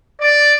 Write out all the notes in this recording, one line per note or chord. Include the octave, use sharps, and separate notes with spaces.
D5